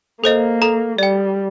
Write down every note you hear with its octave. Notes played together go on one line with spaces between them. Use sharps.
A#3 A4 C5 D#5
A4 A#5
G3 D5 G5